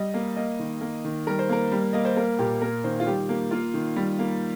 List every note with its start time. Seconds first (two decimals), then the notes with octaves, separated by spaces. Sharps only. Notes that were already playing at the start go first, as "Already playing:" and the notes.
Already playing: G3 D#5
0.14 A#3
0.36 A#3 D#5
0.59 D#3
0.81 A#3
1.04 D#3
1.27 G3 A#4
1.39 C5
1.49 A#3 A#4
1.72 G3
1.93 A#3 D#5
2.05 C5
2.16 A#3 A#4
2.39 A#2 G4
2.62 A#3 A#4
2.84 D#3 C5
3.00 F4
3.07 G3 G4
3.29 A#3
3.51 A#3 F4
3.74 D#3
3.96 G3
4.19 A#3